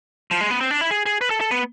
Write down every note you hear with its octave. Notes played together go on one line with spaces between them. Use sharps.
F3
G#3
B3
C4
D4
E4
G#4
G#4
B4
A4
A4
B3